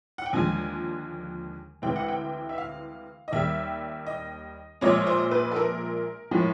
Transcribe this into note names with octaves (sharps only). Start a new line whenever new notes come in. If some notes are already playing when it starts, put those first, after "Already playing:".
F#5
G5
D#2 D3 F3 G#3 G#5
D2 C3 E3 G#3 G5
F#5
G5
E5
F5
D#5
D#2 D#3 G3 E5
D#5
A#1 A#2 F3 G#3 C#5
C5
B4
A4
A#4
A2 F3 G#3